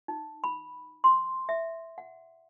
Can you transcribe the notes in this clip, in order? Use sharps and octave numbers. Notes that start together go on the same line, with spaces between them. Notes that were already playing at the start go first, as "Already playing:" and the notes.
D#4
B5
C6
E5
F#5